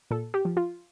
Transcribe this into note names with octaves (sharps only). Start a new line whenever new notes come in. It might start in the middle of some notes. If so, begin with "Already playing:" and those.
A#2 A4
G4
F3
F4